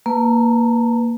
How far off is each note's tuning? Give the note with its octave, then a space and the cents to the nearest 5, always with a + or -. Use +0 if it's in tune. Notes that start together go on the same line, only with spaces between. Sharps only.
A#3 +0 B4 +0 A5 +25